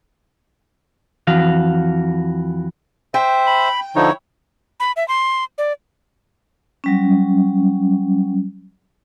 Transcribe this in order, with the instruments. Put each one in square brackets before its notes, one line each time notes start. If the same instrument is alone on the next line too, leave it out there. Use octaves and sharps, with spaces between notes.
[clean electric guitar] F2 E3 F#4 F5
[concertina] C5 E5 [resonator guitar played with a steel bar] G5
[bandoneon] B5
[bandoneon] D3 F3 D#4 [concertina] E4 C#5
[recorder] B5
E5
C6
D5
[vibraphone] F#3 G3 C#4